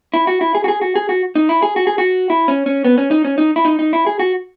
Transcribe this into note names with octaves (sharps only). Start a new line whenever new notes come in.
E4
F#4
E4
G#4
F#4
G#4
F#4
G#4
F#4
D#4
E4
G#4
F#4
G#4
F#4
E4
C#4
C#4
B3
C#4
D#4
C#4
D#4
E4
D#4
D#4
E4
G#4
F#4